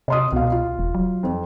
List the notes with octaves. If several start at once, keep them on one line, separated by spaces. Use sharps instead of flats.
C3 D#5 C6 D#6
C2 B2 F5
F4
E1
F#3
F2